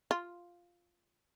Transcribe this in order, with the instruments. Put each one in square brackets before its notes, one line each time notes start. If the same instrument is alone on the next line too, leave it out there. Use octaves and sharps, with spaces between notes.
[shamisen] F4